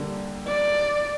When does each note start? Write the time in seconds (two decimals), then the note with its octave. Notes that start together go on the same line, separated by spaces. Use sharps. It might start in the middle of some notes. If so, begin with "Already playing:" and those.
Already playing: D3 G3 A#3
0.48 D5